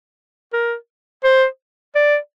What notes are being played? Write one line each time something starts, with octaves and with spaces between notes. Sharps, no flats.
A#4
C5
D5